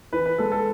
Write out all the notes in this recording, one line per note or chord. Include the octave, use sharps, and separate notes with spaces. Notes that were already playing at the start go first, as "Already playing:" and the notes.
E3 B4
B4
G#3 A4
A4